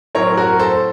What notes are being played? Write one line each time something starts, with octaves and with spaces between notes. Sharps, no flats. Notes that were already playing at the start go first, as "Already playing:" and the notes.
A2 F#3 C4 A#4 C#5
F#4 A#4
A4 C5